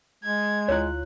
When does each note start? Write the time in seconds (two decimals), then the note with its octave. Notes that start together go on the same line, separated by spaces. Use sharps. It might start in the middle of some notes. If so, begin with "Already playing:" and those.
0.24 G#3 G#6
0.68 D2 E4 F4 C#5 F#6